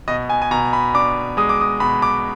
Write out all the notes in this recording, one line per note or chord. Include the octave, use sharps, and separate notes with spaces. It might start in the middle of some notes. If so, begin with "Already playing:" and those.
B2 D#5
G#5
G#5
B2 A#5
B5
D4 D6
G#3 D#6
D6
D#6
B2 B5
D6